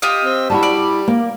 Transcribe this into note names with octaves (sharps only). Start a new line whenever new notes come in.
F4 G4 D#5
C4
G3 E4 F#4 A5
D5
A#3